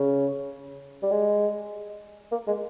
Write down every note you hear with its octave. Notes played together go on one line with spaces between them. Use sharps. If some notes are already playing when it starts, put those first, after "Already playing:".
Already playing: C#3
G3
G#3
A#3
G#3